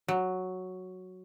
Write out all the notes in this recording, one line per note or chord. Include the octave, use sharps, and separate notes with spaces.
F#3